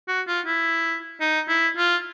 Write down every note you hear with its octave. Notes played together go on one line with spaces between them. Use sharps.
F#4
F4
E4
D#4
E4
F4